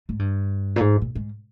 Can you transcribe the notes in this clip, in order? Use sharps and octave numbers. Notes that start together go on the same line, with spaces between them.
G#2
G2
A#2
G#2
A#2
G#2